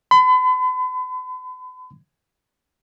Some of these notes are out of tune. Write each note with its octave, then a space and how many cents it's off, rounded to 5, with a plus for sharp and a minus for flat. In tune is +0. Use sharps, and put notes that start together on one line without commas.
B5 +40